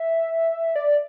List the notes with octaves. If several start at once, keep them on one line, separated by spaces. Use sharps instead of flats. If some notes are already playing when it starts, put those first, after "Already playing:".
Already playing: E5
D5